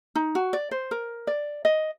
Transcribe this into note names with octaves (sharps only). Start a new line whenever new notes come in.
D#4
F#4
D5
C5
A#4
D5
D#5